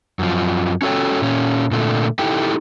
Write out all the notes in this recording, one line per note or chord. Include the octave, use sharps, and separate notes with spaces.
F#2 F3
C#4 F#4 A4 C#5 G5
A#2 C#4
A#2 D3 A3
D#4 E4 G4 A4 G5